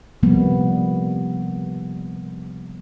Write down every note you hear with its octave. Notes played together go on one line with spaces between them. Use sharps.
C3 F3 G3 A#3 B3